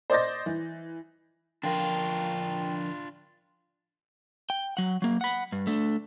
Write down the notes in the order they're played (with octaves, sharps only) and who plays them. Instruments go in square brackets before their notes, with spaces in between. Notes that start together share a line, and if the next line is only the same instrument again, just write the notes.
[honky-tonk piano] C5 D5 D#5 G6 A6 A#6
E3
[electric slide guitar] D3 F3 A#4 [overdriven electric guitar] D4 F4 [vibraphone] G5
[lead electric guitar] G5
F#3 F#5
F#3 A#3
F#5 B5
G2
A3 D4